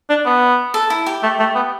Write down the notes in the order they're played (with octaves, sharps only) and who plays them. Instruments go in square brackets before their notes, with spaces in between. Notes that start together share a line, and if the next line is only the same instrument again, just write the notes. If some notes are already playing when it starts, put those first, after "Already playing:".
[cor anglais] D4
B3
[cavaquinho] A4
E4
G4
[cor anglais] A3
A3
B3